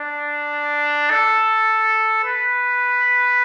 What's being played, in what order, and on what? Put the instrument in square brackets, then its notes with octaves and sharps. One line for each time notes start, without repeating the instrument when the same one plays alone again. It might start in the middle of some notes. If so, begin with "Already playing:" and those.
Already playing: [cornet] D4
A4
B4